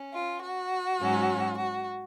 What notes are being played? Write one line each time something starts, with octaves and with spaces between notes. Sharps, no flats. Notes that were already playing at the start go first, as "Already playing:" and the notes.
Already playing: C#4
F4
F#4
G#2 F#3 C#4
F#4